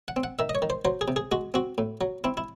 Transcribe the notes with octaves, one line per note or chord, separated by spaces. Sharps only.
F#5
C4
F#5
D#3 E5
D#5
C#5
D#3
C5
F#3 C5
G#4
C3
G#4
G#3 F#4
C4 F#4
A2
F#3
C4 E4
E4